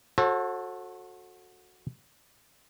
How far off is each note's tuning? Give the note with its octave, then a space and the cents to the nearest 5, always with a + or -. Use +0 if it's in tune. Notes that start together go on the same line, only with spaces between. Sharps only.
F#4 -20 A4 +0 C5 +45